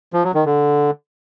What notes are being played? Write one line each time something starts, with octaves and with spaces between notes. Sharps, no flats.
F3
F#3
D#3
D3